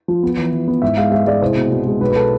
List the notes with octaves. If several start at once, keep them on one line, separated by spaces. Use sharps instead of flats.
F3
B3
E3
E3
B3
G#2 E5
G#3 F5
G#3 E5
G#3 D5
C2 C5
B2
B2
G#3
B1 B4
B4
A4